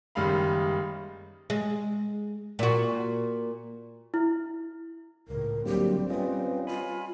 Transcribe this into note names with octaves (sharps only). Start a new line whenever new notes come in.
F#1 D#3 G3 G#3 F5 B5
G#3
A#2 F#4
E4
C#2 A2 A#4
D3 F#3 G3 A#3 C4 G4
C#4 F4 B4 D#5
F4 G#5 B5